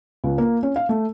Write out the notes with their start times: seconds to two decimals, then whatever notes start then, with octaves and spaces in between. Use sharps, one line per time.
0.24 C#2
0.38 A#3
0.63 C#4
0.76 F5
0.89 A3